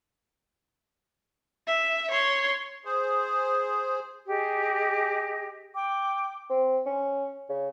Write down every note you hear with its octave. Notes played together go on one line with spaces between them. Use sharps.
E5
C#5 C6
G#4 C5
G4 G#4 D#5
G5 D6
C4
C#4
C#3